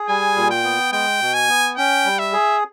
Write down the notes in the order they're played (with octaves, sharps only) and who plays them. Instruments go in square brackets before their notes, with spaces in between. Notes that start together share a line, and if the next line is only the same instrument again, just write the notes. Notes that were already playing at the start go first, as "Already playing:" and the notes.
Already playing: [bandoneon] G#4
[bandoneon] G3 [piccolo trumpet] G#5
[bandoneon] A#2
[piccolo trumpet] G5
[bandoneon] B3
[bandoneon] G#3 [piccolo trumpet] G5
[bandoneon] B2
[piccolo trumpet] G#5
[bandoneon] B3
[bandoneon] C#4 [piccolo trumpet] G5
[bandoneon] G3
[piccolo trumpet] E5
[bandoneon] G#4